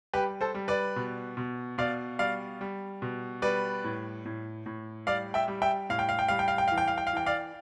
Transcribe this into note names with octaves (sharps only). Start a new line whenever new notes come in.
G3 G4 B4
A4 C5
G3
B4 D5
B2
B2
B2 D5 F5
G3 D5 F5
G3
B2
G3 B4 D5
A2
A2
A2
G3 D5 F5
E5 G5
G3
E5 G5
A2 F5
G5
F5
G5
G3 F5
G5
F5
G5
E3 F5
G5
F5
G5
F5
E3 G5
D5 F5